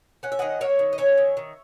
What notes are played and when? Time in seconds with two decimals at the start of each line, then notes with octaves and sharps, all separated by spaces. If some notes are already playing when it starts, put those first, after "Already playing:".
0.23 C#4 F#5
0.32 E5
0.39 D#3 D#5 F#5
0.61 A#3 C#5 E5
0.79 D#3
0.93 D#5
0.98 C#4 C#5 E5
1.17 D#3
1.37 D#3